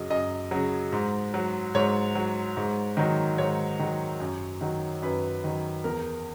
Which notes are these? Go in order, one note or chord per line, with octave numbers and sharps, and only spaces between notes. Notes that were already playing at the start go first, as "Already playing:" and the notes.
Already playing: F#2 C#3 F#3 D#5
F#2 D#5
C#3 F#3
G#2
F#3
G#2 C#5
F#3
G#2
D#3 F#3
G#2 C#5
D#3 F#3
F#2
D#3 F#3
F#2 B4
D#3 F#3
E2 A#4